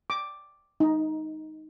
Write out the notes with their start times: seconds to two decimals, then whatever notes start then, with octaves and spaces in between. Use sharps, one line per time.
0.10 D6
0.80 D#4